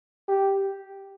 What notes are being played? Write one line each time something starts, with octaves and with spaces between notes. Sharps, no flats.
G4